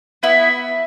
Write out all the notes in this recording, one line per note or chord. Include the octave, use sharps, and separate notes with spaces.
B3 E4 E5